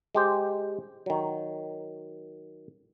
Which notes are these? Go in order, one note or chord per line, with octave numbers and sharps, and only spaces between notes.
G#3 G4 C5
D#3 F#3